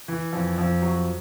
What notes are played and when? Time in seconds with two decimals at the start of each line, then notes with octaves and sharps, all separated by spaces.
0.08 E3
0.33 F2
0.58 F2
0.82 F#3